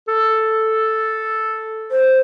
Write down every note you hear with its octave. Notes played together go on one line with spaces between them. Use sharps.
A4
C5